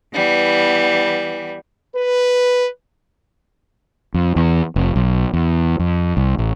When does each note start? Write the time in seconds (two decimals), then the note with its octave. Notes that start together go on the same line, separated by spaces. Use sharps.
0.13 E3 G3 B3
1.95 B4
4.14 F2
4.36 E2
4.76 F1
4.96 B1
5.34 E2
5.79 F2
6.17 C2
6.38 A1